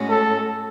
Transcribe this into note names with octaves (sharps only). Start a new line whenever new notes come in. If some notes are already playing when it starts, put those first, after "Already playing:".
Already playing: A2 G#3 C#4 F#4
A4